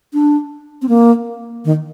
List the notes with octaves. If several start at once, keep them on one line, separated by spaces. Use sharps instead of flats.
D4
C4
A#3
D#3